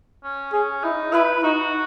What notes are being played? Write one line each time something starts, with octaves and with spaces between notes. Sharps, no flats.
C#4
C#4 G#4
D#4 E4
E4 B4
D#4 F#4